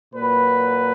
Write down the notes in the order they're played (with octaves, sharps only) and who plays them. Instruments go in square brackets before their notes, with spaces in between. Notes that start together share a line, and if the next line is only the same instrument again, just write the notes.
[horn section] A#2 F#3 B4